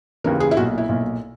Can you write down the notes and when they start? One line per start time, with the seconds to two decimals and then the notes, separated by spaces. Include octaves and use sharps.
0.24 D#2 C#3 E3 A#4
0.40 G#4
0.51 E4
0.57 B1 A#2 F#4
0.78 E4
0.89 B1 A#2